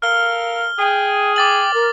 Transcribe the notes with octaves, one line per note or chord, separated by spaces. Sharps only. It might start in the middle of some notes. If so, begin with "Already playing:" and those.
A4 A#4 F5 F6 G7
G#4 G5
G5 D6 A6 F#7
A#4